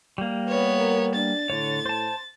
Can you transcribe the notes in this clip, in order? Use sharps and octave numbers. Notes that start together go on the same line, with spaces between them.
G3 A#3
B3 B4 C#5
A#4
D4 A6
A2 D3 C#5
C5 A5